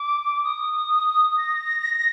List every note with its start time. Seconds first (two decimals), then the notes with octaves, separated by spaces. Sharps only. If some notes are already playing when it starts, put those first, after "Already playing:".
Already playing: D6
0.44 D#6
1.38 A#6